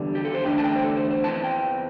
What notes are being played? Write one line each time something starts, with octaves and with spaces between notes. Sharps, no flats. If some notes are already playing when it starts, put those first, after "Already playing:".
Already playing: E2 D3 G3
G4
A4
C5
E2 D3 A3 D4 G5
A5
G5
C5
A4
C5
C5
E2 E3 C4 A5
G5